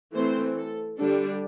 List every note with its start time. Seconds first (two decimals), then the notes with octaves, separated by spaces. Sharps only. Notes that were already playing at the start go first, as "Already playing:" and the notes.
0.15 E3 A3 C4 C5
0.57 A4
0.98 D3 G3 D4 A4